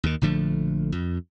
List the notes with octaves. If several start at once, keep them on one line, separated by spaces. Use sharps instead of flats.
D#2 D#3
A#1 D3 F3 A3
F2